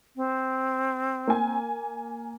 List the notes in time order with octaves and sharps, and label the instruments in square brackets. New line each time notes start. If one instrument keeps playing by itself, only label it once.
[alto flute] C4
[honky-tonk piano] A#3 G#5